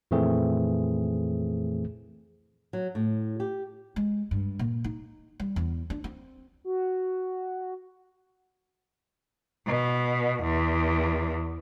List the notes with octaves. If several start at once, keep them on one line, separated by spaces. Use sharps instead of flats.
F2 A#2 E3 A3 C4 G#4
F#3
A2
G4
G#3
G2
A#2
D#4
G3
E2
D4
C4
F#4
B2
E2